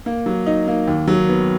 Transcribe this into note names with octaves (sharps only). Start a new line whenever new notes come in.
A#3
F#3
D#4
A#3
D#2
F#3
B3